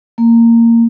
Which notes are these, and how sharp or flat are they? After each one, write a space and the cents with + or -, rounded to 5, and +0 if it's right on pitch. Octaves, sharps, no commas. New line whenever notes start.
A#3 -15